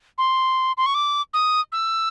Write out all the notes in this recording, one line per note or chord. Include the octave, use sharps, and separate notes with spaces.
C6
C6
C#6
D6
D#6
E6